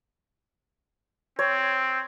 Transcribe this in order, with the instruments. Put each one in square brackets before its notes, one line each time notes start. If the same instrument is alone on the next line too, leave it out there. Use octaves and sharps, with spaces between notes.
[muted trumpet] C4 [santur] C#5